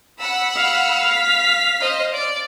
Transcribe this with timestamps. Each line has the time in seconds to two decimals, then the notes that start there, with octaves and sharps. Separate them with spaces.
0.19 F#5 B5 E6
0.56 F5
1.10 B6
1.81 C5 D#5
2.14 D5